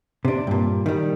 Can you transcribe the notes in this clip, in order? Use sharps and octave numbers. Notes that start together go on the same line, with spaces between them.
C3 D4
G2 A#2
D#3 G3